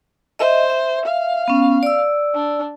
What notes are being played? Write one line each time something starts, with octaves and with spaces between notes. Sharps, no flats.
C5 D#5 E5
E5
F5
B3 C#4
D5 E6
D4